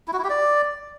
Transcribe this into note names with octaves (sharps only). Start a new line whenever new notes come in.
E4
F#4
E4
G4
D5